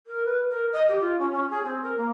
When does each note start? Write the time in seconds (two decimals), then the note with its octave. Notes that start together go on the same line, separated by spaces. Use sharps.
0.07 A#4
0.25 B4
0.49 A#4
0.72 D#5
0.88 G4
1.00 F4
1.19 C#4
1.32 C#4
1.50 G#4
1.63 C4
1.82 A#4
1.97 A#3